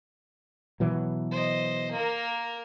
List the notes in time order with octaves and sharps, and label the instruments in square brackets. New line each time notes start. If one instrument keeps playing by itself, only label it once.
[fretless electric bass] B2 E3 F#3
[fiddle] C5 D#5
A#3 A#4